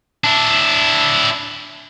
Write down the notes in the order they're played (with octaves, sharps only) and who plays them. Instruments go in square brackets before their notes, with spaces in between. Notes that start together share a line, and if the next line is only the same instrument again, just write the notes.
[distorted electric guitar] D4 E4